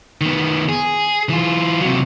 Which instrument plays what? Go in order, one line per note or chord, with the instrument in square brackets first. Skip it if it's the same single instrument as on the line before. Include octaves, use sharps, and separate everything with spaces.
[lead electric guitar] D#3 B3
G#4
E3 F4
C3 F#3